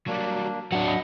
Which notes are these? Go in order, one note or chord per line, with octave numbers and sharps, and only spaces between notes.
F#3 G3 A#3 D4
F#3 D4 F#5
D#5 F#5 B5 D#6